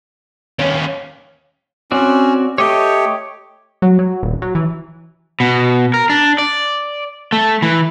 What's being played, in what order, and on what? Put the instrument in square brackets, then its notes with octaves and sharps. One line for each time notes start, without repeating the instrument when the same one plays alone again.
[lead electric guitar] D#2 C#4 [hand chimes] C#5
[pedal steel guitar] C4 F#4 D5 [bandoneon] C#4
[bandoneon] A3 G4 [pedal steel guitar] C#5 D#5 G5
[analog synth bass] F#3
F#3
D#1
F#3
E3
[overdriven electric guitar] B2
A#4
D4
D5
A3
E3